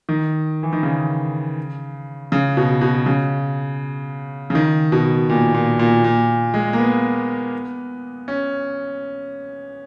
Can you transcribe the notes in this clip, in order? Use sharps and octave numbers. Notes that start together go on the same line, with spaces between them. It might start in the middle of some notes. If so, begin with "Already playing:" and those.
D#3
E3
D#3
C#3
C#3
B2
B2
C#3
C#3
D#3
B2
A#2
A#2
A#2
A#2
G#3
A#3
B3
C#4